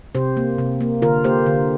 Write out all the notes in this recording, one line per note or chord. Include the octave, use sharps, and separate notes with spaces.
C3 G4 C5
A#3
C3
A#3
D3 F4 A#4
A#3 G4 C5
D3